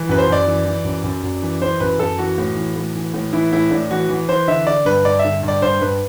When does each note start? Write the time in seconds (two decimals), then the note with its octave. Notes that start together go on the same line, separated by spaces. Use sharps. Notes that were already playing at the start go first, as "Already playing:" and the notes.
Already playing: E3
0.09 F#2 B4
0.18 C5
0.27 F#2 D5
0.46 E3
0.65 E3
0.85 F#2
1.04 F#2
1.23 F#2
1.42 E3
1.61 E3 C5
1.80 F#2 B4
1.99 F#2 A4
2.18 E3 F#4
2.38 A2
2.56 E3
2.76 A2
2.95 E3
3.14 A2
3.33 E3 E4
3.52 A2 E4
3.71 A2 D4
3.91 E3 F#4
4.09 E3
4.29 E3 C5
4.48 D3 E5
4.67 D3 D5
4.85 G2 B4
5.05 G2 D5
5.19 E5
5.24 D3
5.43 G2
5.48 D5
5.62 G2 C5
5.81 G2 B4